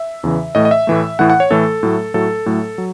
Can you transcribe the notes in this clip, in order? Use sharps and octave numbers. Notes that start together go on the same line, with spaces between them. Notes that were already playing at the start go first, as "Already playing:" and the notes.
Already playing: E5
E2 C#3 E3
A2 E3 A3 D#5
D#5
E5
A2 E3 A3
A2 E3 A3 F#5
F#5
C#5
A2 E3 A3 A4
A2 F#3 A3
A2 F#3 A3 A4
A2 F#3 A3
F#3